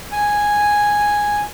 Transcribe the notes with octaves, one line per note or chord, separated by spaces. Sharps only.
G#5